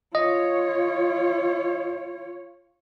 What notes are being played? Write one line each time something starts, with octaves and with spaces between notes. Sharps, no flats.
F4 C#5 D#5